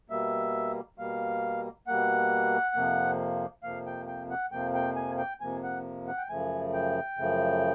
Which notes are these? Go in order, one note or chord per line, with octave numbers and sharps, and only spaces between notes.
B2 G3 A#3 E5
B2 G3 A#3 F5
B2 G3 A#3 F#5
F2 C3 F3 A#3
F2 C3 F3 A#3 F5
G5
G5
F#5
F2 C3 F3 A#3 G5
G5
G#5
G5
F2 C3 F3 A#3 G#5
F#5
F#5
G5
F#2 C#3 F3 A3 G#5
G5
F#2 C#3 F3 A3